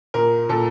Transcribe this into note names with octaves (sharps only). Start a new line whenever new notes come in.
A#2 A#4
A#2 A4